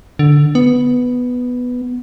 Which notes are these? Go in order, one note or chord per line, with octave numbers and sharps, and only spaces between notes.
D3
B3